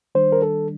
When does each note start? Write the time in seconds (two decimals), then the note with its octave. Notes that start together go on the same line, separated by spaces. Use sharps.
0.15 D#3 G3 D4 C5
0.32 A#4
0.42 A4